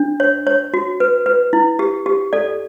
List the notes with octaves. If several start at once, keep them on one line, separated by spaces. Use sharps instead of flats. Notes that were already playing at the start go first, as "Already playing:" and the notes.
Already playing: D4
C#5
C#5
F#4
B4
B4
E4
G4
G4
A4 D5